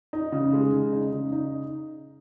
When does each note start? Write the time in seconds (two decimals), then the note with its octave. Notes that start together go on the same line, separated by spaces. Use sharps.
0.13 D#4
0.32 C#3
0.53 G#3
0.73 C#3
0.92 D#4
1.12 C#3
1.32 D#4